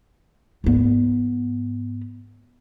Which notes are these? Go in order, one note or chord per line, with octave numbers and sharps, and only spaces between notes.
G#2 B3